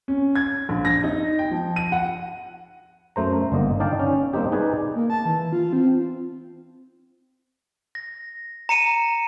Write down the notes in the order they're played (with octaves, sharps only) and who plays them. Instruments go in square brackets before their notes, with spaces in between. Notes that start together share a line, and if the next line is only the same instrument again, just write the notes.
[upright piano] C#4
G#6
A#1
A#6
D#4
G5
F3
D#7
F#5
[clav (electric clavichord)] F#2 A3 C5 A#5
G1 D3 A#3 D#5
D4 D#4 D5 F5 G5 A5
C#4
G3 A#3 C4 D#4 G4
D#4 G#4 B4 D5 G5 G#5
[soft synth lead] A#3
A5
E3
F4
C4
[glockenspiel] A#6
A#5 C#7 D#7 E7